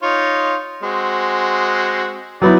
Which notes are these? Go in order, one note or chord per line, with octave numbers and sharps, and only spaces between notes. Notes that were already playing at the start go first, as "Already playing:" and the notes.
D#4 F4 C#5
G#3 C4 F#4
F#3 B3 D#4 E4 D5